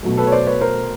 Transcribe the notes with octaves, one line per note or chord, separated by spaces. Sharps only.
B2 F#3 A3
A4 B4
C#5
C5 D5
B4 C#5
A#4 C5